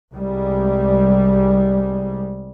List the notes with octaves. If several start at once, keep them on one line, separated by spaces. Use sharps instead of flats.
C2 G3 G#3